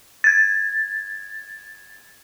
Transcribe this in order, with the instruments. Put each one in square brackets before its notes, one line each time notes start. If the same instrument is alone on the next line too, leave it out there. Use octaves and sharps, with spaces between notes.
[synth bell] G#6 A6